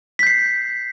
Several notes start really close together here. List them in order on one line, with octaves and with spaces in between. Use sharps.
B6 G6 C7